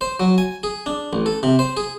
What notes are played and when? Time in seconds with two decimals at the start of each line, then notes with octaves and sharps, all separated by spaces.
0.01 C5
0.20 F#3
0.38 G#5
0.63 G#4
0.86 D4
1.13 A1
1.26 A4
1.43 C3
1.59 C5
1.77 G#4